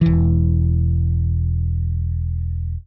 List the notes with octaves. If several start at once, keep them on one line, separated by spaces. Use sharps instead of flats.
E1 E3